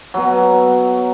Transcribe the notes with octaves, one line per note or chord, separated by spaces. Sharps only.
B2 F#3